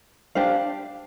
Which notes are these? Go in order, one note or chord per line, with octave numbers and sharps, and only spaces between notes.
D4 G4 C5 F5